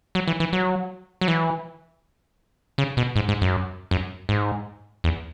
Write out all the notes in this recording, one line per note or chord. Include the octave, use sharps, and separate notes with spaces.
F#3
E3
E3
F#3
F#3
E3
C#3
B2
G#2
G#2
F#2
F#2
G#2
E2